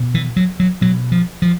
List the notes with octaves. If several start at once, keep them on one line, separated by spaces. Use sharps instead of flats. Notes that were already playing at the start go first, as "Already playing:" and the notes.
Already playing: B2
E3
F#3
F#3
B2 F#3
F3
F3